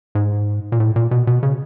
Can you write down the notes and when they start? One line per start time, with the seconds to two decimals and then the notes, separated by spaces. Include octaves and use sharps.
0.15 G#2
0.72 A#2
0.80 A2
0.96 A#2
1.11 B2
1.27 B2
1.43 C#3